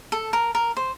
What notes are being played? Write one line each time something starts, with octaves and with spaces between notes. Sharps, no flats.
A4
A#4
A#4
C5